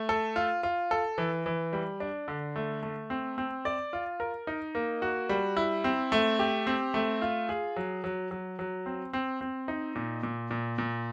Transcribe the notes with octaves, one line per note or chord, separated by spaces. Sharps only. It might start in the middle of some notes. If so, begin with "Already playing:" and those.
Already playing: A3
A4
F4
F4
A4
E3
E3
G3
D4
D3
A3
A3
C4
C4
D5
F4
A#4
D#4
A#3
F#4
G3
E4
C4
A3
G4
C4
A3
F4
G#4
F#3
F#3
F#3
F#3
C4
C4
C4
D#4
A#2
A#2
A#2
A#2